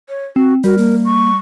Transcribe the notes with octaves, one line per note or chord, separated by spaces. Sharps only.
C#5
C4 F#4
G3 F#4 A#4
A#3
C#6